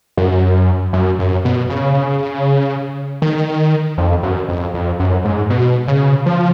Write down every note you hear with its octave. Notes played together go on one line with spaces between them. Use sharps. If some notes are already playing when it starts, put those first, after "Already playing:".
F#2
F#2
F#2
B2
C#3
D#3
F2
F#2
F2
F2
F#2
G#2
B2
C#3
F3